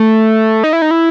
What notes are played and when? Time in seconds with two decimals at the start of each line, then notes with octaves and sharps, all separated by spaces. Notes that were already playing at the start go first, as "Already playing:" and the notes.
Already playing: A3
0.64 D#4
0.73 E4
0.82 D#4
0.91 E4